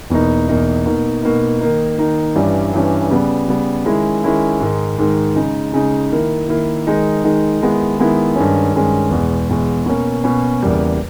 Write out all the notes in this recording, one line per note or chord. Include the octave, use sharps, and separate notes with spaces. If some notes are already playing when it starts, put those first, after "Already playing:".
E2 B2 A#3 D#4
E2 B2 A#3 D#4
B2 A#3 D#4
B2 A#3 D#4
D#3 A#3 D#4
D#3 A#3 D#4
G2 E3 G3 C#4
G2 E3 G3 C#4
C#3 G3 B3
C#3 G3 B3
D#3 G#3 C#4 E4
D#3 G#3 C#4 E4
G#2 D#3 G#3
G#2 D#3 G#3
C#3 G#3 D#4
C#3 G#3 D#4
D#3 A#3 E4
D#3 A#3 E4
D#3 G#3 D#4
D#3 G#3 D#4
D#3 G#3 B3 E4
D#3 G#3 B3 E4
G2 D#3 G#3 C#4
G2 D#3 G#3 C#4
E2 B2 G#3
E2 B2 G#3
B2 A#3 C#4
B2 A#3 C#4
E2 C#3 G3 A#3